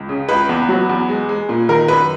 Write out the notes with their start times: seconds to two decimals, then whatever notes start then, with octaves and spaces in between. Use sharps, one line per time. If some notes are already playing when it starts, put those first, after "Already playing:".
Already playing: C#2
0.09 C#3
0.29 C#2 B4
0.49 E2
0.69 F#3
0.89 E2
1.09 G#3
1.29 G#3
1.49 A#2
1.69 D#3 A#4
1.88 F#2 B4